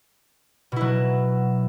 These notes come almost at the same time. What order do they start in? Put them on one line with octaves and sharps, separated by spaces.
B2 E4 F#3